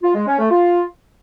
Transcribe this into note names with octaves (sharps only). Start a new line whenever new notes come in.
F4
G#3
C#4
A3
F4